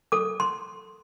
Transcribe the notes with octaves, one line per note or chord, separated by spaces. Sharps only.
A4 D6
C6